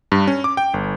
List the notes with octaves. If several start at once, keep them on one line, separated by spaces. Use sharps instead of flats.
G2
C#4
D6
G5
G1